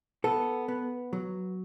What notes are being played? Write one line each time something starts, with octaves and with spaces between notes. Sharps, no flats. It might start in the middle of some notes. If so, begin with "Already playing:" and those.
B3 A4
B3
F#3